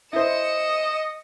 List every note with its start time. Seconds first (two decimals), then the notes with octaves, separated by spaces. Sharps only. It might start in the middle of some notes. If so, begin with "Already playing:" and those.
0.13 E4 C5 D#5 C#7 E7